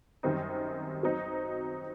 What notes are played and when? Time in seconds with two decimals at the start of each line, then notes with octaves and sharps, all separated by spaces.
0.23 F#2 D#3 G3 C4 D#4
1.03 F#3 C4 D#4